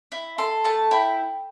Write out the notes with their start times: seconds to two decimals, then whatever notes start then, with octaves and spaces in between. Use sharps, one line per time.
0.12 E4
0.38 A4 C6
0.64 A3 A5
0.91 E4 G5